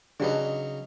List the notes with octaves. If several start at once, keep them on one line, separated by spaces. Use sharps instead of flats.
C#3 F#3 D4 D#4 G4 B4